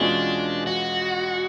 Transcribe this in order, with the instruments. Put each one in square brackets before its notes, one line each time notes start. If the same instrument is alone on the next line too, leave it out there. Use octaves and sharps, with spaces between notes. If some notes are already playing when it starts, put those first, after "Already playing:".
Already playing: [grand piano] E2 B2 G#3 C#4 F4 [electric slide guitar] D4
[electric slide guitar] F#4